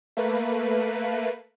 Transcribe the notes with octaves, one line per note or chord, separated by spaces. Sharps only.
A3 A#3 B4